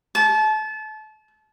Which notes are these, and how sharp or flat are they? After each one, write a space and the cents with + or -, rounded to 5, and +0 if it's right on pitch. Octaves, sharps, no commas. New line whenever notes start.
A5 -30